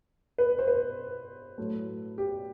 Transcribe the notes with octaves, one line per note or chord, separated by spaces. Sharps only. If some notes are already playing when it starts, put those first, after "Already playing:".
B4
C5
B4
A2 F#3 A3
G4